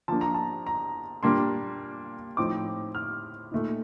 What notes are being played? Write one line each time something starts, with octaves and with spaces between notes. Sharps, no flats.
F3 A#3 D4 A5
A#5
A5
A#5
A#2 G3 A#3 D4 C6
A2 F3 C4 D#4 D6
F6
A#2 A3 D#4